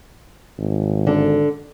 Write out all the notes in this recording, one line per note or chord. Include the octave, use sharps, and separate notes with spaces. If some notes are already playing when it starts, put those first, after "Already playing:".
G#1
D3 A4